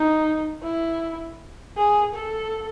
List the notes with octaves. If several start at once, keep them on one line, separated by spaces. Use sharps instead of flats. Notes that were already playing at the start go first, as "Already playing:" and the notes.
Already playing: D#4
E4
G#4
A4